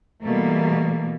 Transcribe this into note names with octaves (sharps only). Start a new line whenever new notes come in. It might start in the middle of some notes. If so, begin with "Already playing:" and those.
B2 E3 G3 A3 A#3